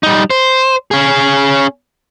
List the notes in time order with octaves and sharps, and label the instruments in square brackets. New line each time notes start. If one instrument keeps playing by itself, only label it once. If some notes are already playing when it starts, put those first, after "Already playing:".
[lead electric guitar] G3 D#4
C5
C#4 G#4